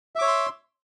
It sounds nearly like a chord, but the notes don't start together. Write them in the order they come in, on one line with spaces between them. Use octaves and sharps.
E5 D6 C#5 E6 C6